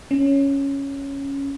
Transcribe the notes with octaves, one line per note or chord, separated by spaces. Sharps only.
C#4